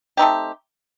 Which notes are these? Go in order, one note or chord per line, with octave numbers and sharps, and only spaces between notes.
A3 C4 D#4 G4